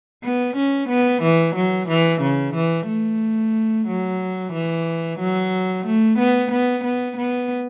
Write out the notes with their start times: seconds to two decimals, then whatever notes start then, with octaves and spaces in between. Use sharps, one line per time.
0.23 B3
0.57 C#4
0.89 B3
1.23 E3
1.56 F#3
1.89 E3
2.22 C#3
2.55 E3
2.88 A3
3.88 F#3
4.53 E3
5.19 F#3
5.86 A3
6.18 B3
6.51 B3
6.84 B3
7.17 B3